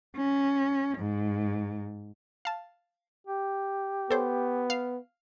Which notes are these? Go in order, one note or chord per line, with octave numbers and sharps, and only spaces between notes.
C#4
G#2
F5 A5
G4
B3 A4 C5 C#5
F5